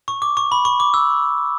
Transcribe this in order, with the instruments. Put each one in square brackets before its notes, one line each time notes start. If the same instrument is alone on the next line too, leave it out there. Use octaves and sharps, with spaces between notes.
[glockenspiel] C#6
D6
C#6
B5
C#6
D6
E6